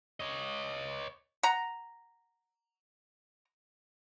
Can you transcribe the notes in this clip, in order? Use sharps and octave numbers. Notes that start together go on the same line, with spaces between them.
C#5 D#5
F#5 A#5